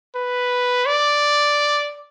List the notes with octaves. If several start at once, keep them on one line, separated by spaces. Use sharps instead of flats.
B4
D5